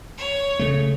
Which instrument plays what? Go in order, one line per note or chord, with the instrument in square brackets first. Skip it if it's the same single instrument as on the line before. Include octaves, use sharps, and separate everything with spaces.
[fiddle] C#5
[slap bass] C#3 A3